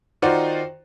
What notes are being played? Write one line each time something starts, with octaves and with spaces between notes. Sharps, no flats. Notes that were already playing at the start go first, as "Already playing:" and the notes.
D#3 D#4 F4 F#4 C5 D5